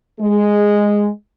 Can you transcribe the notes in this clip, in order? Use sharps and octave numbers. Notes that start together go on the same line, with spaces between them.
G#3